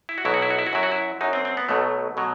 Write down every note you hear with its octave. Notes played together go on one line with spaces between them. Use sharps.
E4
F#4
B1 B2 F#3 E4
F#4
E4
F#4
E4
F#4
F#2 F#3 E4
F#4
E4
F#2 F#3 D#4
C4
C4
B3
B1 B2 F#3 A3
B2 F#3